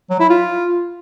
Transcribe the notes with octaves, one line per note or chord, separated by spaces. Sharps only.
F#3
E4
F4